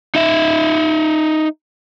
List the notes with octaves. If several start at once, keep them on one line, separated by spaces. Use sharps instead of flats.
D#4 E5